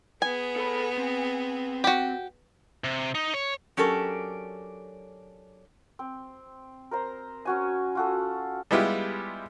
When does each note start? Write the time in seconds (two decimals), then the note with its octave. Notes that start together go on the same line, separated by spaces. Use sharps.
0.22 B3 G#4 G#5
0.56 A4 B5
0.98 C4
1.84 F#4 G4
2.84 C3
3.15 D#4
3.34 C#5
3.77 F#3 C#4 D4 G4 A4 A#4
5.99 C4
6.91 A#4 C5 A#5
7.45 C#4 F#4 G#5
7.95 F4 F#4 A4
8.71 G3 G#3 B3 E4 F4 G4